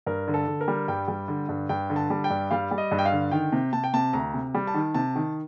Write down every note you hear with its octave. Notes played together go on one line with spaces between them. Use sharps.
G2 A#4
D3
A4
D3
A#4
G3
G2 G5
G3
D3
G2
G2 G5
D3
A5
G3
G5
G2
G3 F5
G3
D#5
G2
G5
F5
D3
D#3 G5
C3
C3 A5
G5
C3 A5
D2 A#5
C3
G3
A5
D#3
C3 A5
D#3